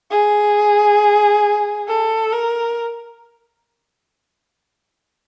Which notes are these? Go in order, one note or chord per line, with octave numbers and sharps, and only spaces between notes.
G#4
A4
A#4